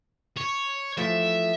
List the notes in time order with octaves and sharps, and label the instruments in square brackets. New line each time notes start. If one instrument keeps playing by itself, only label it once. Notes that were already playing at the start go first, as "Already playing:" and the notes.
[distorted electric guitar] C#5
[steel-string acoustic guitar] E3 F3 A3 [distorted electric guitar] E5